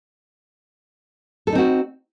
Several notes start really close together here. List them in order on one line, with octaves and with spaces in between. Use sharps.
A4 D4 D#4 C4 F#4